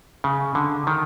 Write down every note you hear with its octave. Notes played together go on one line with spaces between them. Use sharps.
C#3
D3
D#3